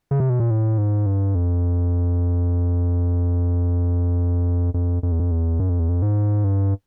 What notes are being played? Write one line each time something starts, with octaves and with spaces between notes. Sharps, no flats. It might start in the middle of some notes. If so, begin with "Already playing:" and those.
C#3
C3
B2
A#2
A2
G#2
G2
F2
F2
F2
E2
F2
E2
F#2
F2
E2
F2
G#2
G2